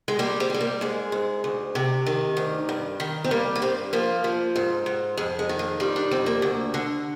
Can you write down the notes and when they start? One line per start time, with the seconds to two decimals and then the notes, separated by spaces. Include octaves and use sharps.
0.08 G#3
0.19 G3 A#3
0.40 C4
0.50 G3 G#3
0.61 A#3
0.81 G#2 G#3
1.12 G#2
1.44 D2
1.75 C3
2.06 D#3
2.37 D2
2.69 G2
3.00 D#3
3.24 C4
3.31 G3 A#3
3.56 A#3
3.62 G2 C4
3.93 F3 A#3
4.24 F3
4.56 G#2
4.86 G#2
5.17 F2 G#3
5.39 G#3
5.49 D#3
5.59 A#3
5.80 G3 F4
5.96 D4
6.11 F2 C4
6.26 A#3
6.42 D2
6.74 D3